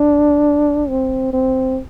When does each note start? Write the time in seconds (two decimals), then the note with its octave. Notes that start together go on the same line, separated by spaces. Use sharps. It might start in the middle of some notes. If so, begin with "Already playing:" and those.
Already playing: D4
0.89 C4
1.33 C4